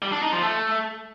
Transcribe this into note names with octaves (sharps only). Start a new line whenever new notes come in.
G3
D4
D#4
F3
A3